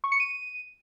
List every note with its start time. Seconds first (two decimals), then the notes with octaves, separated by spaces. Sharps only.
0.04 C#6
0.12 C#7
0.20 D#7